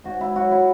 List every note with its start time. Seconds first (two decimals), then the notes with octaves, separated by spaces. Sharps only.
0.04 G#2 F#4
0.21 E4
0.35 F#3 F#4
0.51 E4